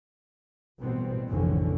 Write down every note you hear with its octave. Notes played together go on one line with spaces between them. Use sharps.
A1 B2 G3 B3 C4
F1 A#1 A2 D3 E3 C#4